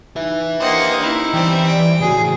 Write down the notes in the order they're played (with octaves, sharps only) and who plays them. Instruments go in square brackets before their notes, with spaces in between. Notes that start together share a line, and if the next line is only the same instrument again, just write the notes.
[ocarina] D#4 [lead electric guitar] B4 E5
[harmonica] A#3 G4 C5 [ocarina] D4 [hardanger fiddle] D#5 F#5
[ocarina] C#4 [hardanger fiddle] D#4 E4
[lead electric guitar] E3 [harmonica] G3 C4 [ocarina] C5
[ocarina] D5 [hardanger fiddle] G5
[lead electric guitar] A2 C#3 [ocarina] F#4 [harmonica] G#4